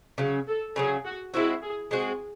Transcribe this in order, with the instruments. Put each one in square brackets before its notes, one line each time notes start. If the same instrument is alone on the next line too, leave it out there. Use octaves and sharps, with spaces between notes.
[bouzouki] C#3 F#3 C#4
[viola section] A4
[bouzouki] C#3 F#3 C#4 [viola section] G#4
[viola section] F#4
[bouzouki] G#3 C4 F#4 [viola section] E4
[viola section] G#4
[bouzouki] G#3 C4 F#4 [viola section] G#4